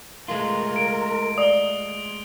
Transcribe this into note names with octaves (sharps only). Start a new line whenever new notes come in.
G#3 A3 F4 A#4
D7
D5 D#6 G7